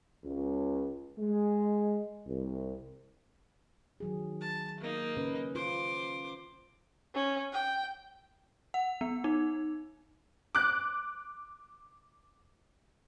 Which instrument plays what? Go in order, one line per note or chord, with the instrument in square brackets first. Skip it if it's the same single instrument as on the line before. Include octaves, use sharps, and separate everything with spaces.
[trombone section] C#2
G#3
C2
[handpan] D#3 F#3 G#4
[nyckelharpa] A5
A#3 D#4
[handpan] C#3 C#4 B4
[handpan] F4 [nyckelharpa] C5 D6
[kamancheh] C#4
G5
[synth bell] F#5
B3
D#4
[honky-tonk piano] D6 F#6